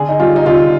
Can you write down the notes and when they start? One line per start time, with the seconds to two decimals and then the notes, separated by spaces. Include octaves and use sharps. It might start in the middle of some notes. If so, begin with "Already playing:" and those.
Already playing: D3 G#4
0.09 D#4
0.20 G3 F4
0.36 D#4
0.46 D3 F4